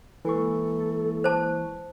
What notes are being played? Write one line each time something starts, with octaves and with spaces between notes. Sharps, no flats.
E3 G#3 A#3 E4 A4 C#6
C5 A5